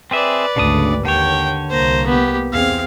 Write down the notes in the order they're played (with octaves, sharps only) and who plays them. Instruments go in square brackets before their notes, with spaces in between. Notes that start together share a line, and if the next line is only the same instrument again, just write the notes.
[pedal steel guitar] C4 G#4 E5 [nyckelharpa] B4 D5
[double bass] G#1 D2 [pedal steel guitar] C#3 D4 D#6
[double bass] D#2 [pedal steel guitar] D3 C#5 [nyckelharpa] G5
[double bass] C2 A#3 [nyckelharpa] C5 A#5
[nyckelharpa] B3 G4
[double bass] E2 C4 [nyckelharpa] G#4 F5